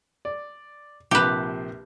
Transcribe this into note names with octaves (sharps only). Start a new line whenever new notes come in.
D5
A#1 C3 F3 G4 B4